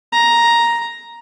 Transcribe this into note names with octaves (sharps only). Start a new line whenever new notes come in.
A#5